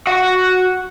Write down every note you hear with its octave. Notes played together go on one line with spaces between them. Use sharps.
F#4 F#5